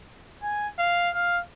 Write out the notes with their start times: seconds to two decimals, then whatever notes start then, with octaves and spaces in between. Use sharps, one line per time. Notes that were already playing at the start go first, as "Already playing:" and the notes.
0.42 G#5
0.78 F5
1.14 F5